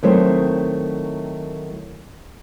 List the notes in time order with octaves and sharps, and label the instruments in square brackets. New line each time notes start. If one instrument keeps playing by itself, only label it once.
[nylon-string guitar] D#3 F#3 A3 C4 E4 C5